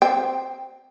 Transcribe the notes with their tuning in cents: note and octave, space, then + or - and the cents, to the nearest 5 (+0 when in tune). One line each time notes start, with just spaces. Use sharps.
C4 +0 G5 +20